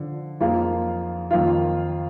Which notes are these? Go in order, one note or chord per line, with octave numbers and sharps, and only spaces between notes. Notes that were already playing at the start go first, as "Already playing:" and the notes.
Already playing: D3 F3
F2 F3 A#3 F4 G#4
F2 D#3 A#3 F4